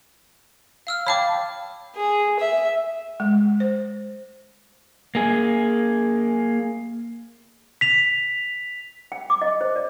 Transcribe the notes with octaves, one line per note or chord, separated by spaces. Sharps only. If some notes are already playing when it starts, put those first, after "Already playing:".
F5 E6 F6
C#5 F5 G5 A5 B5 D6
G#4
E5
G#3
C5
A#3 G#4
B6 F7
G5
D6
D#5
C5
D5